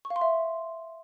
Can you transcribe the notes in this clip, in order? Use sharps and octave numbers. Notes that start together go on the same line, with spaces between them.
C#6
F5
C6
E5